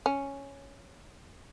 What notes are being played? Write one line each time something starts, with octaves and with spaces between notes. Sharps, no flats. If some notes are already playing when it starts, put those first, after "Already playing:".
C#4